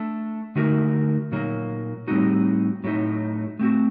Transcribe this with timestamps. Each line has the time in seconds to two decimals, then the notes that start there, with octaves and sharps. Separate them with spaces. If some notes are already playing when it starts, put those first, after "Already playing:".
Already playing: A3 D4 A4
0.56 D3 A3 D#4 F#4 A#4
1.32 A#2 F#3 A#3 D#4
2.07 A2 G3 C4 D#4 F#4
2.84 A2 F#3 A3 D#4
3.59 A3 C4 F#4